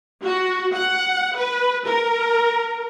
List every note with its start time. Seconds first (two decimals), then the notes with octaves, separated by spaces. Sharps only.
0.24 F#4
0.74 F#5
1.36 B4
1.86 A#4